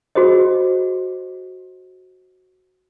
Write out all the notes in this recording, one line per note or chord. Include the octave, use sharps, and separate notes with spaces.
F#4 G#4 C5 D#5